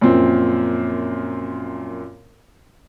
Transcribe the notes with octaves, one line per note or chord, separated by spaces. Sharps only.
F#2 A#2 F3 C4